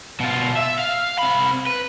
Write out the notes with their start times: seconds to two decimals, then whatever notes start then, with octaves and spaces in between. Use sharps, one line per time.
0.20 B2 F4
0.56 E5
0.79 F5
1.19 C3 B5
1.67 B4